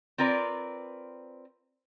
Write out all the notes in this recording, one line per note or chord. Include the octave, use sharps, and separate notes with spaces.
C4 F4 A#4 B4 D5